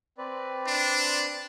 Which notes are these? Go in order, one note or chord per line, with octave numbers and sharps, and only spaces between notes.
C4 B4 D5
D4